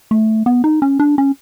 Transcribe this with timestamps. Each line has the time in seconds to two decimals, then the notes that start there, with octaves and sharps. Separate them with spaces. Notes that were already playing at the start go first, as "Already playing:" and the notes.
0.11 A3
0.46 B3
0.64 D#4
0.82 C#4
0.99 D4
1.18 C#4